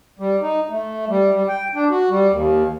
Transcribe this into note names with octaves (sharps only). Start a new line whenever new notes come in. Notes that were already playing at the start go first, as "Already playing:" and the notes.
G3
D#4
A3
G3
G3
G5
D4
F#4
G3
D#2